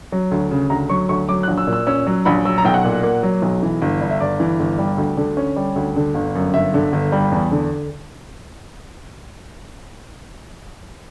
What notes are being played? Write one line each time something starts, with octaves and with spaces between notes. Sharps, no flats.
F#3
D2
C#3
D2 A#5
F#3 C#6
D2 C#6
F#3 D6
F#6
A#1
E6
A#2
E6
C#4 E6
F#3
A#1 B5
F#3 E6
A#5
B1 G5
F#5
A#2
A#3
F#3
B1
E3
G1
G2
E5
G1 D5
E3
G1
G3
D2
D3
C#4
G3
D2
D3
G1
F#2
G1 E5
D3
G1
G3
E2
D3